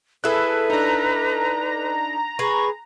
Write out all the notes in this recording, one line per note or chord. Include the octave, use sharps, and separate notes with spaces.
E4 G#4 A4 B4 E5 F#6
D4 D#4 A#5
G#4 B4 C#6